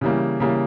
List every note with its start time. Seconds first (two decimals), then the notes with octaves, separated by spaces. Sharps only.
0.01 C#3 E3 G3 A#3
0.40 C#3 E3 G3 A#3